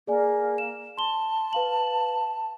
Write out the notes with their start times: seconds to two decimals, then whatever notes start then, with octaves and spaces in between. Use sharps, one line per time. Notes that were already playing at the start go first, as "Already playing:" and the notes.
0.07 A#3 G#4 D5 G#5
0.58 E7
0.98 A5 C6 G7
1.53 B4 F5 F#7